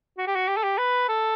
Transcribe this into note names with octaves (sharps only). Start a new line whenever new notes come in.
F#4
G4
F#4
G4
A4
G4
B4
A4